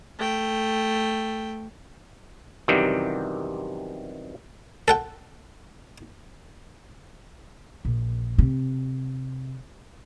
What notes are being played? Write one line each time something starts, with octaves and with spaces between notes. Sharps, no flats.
A3 G5
F#2 C3 D#3 E3 G3
A4 F#5 G5
A#1
C3